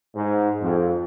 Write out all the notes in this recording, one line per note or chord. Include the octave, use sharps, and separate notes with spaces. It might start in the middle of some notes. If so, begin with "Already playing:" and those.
G#2
F2